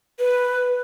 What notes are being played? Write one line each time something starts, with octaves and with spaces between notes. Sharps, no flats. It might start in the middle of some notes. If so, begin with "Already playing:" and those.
B4